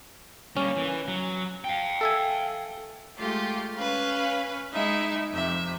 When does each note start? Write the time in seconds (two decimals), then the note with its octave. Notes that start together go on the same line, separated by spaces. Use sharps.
0.57 G3 A#3 C#4
0.76 E3
1.08 F#3
1.64 F5 G5
2.01 A4 E5 G#5
3.18 G#3 A3 F4 G4
3.77 C#4 B4 F5
4.73 G#3 D#4 E4 E5
5.32 F2 C3 E5